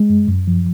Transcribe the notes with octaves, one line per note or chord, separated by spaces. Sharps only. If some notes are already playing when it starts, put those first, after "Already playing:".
Already playing: G#3
F#2
F#2
F3